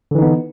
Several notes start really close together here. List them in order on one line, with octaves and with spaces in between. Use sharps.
D3 E3 D#4 B3